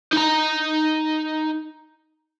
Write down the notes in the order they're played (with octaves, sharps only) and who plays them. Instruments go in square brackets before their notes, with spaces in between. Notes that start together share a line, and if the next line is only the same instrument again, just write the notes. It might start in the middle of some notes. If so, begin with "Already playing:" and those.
[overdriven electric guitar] D#4 A#5